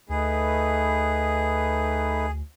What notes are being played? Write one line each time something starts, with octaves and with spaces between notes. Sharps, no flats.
D2 A3 D#4 G#4 B4